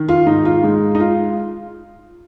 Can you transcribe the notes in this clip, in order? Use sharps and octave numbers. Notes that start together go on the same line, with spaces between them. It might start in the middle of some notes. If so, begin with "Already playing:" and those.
Already playing: D#3
F4
G#2 D#4
F4
G#3 D#4
D#4
F4